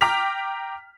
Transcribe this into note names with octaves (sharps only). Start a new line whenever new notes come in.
G5 A#5 D6 F6 B6 F7